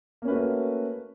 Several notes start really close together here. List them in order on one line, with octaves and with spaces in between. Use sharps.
A#3 C#4 B4 F#4 A3